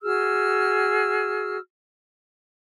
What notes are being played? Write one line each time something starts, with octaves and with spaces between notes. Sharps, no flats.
F#4 G#4 E6 F6